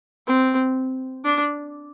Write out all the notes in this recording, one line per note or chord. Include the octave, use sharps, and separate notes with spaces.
C4
D4